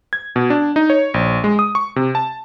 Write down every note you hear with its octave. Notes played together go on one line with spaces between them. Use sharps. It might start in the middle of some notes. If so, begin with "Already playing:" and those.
G#6
B2
D4
D#4
C#5
A#1
G#3
D#6
C#6
C3
A5